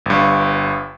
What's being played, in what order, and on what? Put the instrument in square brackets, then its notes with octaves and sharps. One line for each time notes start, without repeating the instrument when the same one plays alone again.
[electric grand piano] G1 G2